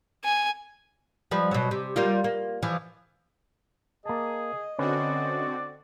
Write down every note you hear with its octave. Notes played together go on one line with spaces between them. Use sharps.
G#5
F3 G3 B4
B2 F#3
C3
G3 A#3 F4
A#3
E3 F3
A#3 G#4 D#5 A5
D3 C4 C#4 F#4 B4 D5